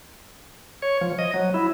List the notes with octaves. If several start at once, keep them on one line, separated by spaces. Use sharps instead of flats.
C#5
F3
D#5
F#3
E4